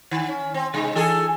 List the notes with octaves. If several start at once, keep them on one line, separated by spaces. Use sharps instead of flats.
D#3
C#4
C4
C3 G#3 D#4
E3 G#4 A4